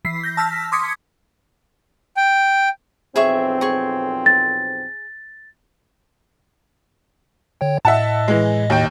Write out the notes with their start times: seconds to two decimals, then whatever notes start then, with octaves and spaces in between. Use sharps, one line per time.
0.05 E3 B6 C7
0.23 G6 A#6
0.37 A5 E6 F6 A#6 B6
0.72 C6 D6 D#6 G#6 B6 C#7
2.17 G5
3.16 B1 F2 C4 G#4 E5 C#6
3.61 G#4 C#6
4.26 A6
7.61 D3 C#5 G5
7.85 A2 D#5 E5 F#5 A5
8.28 E3 G#3
8.70 D#2 G5